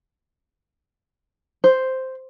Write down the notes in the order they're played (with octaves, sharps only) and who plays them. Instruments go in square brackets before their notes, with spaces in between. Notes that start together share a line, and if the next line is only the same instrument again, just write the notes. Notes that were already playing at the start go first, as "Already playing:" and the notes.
[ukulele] C5